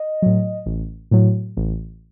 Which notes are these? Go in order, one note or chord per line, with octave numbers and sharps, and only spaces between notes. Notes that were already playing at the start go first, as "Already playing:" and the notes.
Already playing: D#5
A2 F#3
A1
A2 F#3
A1